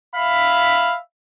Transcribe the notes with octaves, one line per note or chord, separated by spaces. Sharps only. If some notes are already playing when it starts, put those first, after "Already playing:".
E5 F5 B5